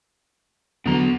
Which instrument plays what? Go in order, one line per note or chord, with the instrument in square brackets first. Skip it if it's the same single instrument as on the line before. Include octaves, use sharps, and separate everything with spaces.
[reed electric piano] E2 D3 F#3 [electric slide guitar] B3 A#5